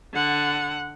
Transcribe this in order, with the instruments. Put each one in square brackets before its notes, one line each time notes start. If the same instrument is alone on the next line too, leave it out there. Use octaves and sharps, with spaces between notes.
[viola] D3 F#5